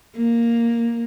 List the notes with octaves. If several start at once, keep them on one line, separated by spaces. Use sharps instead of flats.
A#3